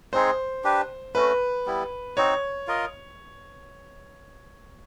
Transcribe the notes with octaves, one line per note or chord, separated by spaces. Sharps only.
G#3 C4 D#4 G#4 C5
D4 G4 B4
A3 C#4 F#4 B4
G3 B3 E4
C4 D#4 F#4 C#5
F4 A#4 D#5